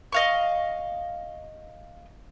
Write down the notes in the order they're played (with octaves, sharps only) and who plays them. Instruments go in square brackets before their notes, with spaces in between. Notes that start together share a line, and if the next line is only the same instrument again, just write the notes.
[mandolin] D#5 F5 C#6